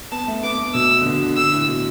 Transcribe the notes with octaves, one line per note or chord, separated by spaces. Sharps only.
B3 A5
A3
B3 D6
A3
B2 E6
D3
B2
D3
D3 E6
A2
B2